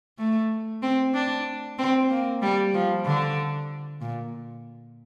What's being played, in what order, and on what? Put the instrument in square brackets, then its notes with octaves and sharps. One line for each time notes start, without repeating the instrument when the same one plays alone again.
[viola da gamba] A3
C4
D4
C4
A#3
G3
F3
D3
A#2